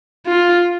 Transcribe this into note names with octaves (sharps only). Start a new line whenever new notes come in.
F4